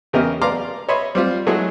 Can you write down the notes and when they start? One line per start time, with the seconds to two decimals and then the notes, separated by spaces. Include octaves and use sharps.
0.13 E2 C#3 G4 A#4 D#5
0.42 D5 F5 A#5 C6 D6 F6
0.89 C#5 D#5 E5 B5 C6
1.15 G3 C4 F4
1.47 F#3 G#3 A3 E4 F#4 G#4